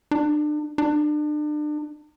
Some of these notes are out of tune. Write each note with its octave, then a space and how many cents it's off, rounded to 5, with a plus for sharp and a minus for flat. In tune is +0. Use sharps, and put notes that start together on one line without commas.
D4 +35
D4 +35